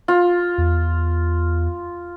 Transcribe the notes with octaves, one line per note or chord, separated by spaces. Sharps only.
F4
E2